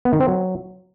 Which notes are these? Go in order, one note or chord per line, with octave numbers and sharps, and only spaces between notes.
B3
D#3
C4
F#3